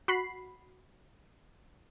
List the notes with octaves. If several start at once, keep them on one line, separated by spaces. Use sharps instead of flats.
F#4 B5 C7